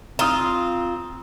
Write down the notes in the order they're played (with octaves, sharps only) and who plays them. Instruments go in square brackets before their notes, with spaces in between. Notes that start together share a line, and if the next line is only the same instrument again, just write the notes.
[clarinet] C4 [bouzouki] F4 [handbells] A#5 [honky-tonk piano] D#6 E7